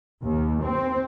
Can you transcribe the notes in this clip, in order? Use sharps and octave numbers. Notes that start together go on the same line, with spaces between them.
D#2
C4